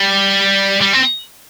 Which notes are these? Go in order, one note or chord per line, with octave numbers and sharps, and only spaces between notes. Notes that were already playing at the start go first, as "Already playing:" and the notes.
Already playing: G3
G3
C4